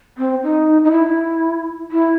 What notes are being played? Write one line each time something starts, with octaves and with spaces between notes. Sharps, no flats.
C4
D#4
D#4
E4
E4